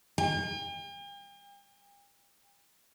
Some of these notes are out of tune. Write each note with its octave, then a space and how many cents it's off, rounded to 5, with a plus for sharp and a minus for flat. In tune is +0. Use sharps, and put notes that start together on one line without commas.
G5 +45